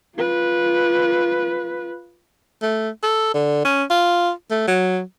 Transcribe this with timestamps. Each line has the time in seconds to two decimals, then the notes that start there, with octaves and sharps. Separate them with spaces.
0.16 F4 B4
2.63 A3
3.03 A4
3.34 D3
3.65 C#4
3.90 F4
4.51 A3
4.68 F#3